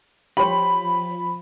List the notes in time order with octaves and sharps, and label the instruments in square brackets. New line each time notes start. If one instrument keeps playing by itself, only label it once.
[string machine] F3 [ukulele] G4 C5 C#5 [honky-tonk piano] B5